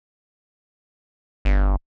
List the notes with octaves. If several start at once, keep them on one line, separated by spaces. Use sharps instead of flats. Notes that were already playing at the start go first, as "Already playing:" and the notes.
G1